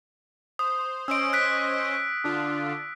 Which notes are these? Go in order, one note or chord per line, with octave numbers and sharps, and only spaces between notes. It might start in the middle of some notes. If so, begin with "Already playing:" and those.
C5 D#6
C#4 C5 D#5 E6 D7
F#6 B6 D7
D3 D4 F4